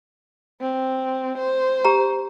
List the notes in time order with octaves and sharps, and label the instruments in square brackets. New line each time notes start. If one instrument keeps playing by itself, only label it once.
[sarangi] C4
C5
[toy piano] G4 A#5